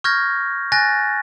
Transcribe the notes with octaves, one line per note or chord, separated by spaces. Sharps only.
C#6 F6 G6 G#6 A#6
G#5 F#6 A6 A#6